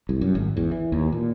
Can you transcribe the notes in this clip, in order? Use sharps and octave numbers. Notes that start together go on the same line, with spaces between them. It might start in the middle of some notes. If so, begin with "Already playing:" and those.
C2
F#2
G#1
E2
E3
D#2
A#2